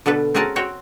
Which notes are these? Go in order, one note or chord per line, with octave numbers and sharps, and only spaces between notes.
B2 D3 A4 B4
C4 C#4 F#4 G#4 A#4 A5
C4 F#4 C#5 G5